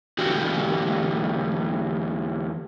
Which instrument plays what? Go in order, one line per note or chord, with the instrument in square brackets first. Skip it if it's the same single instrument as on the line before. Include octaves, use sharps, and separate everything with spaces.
[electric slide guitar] E2 D3 F#4 G4